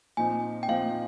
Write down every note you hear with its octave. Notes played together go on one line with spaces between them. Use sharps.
A#2 F3 C4 D#4 G#5
G5
A#2 F3 C4 D#4 F5